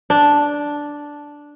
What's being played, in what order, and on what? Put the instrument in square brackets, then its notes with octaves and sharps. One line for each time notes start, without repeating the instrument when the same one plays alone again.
[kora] D4